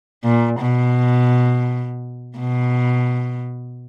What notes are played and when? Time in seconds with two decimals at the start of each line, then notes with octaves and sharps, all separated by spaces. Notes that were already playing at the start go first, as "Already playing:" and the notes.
0.24 A#2
0.60 B2
2.38 B2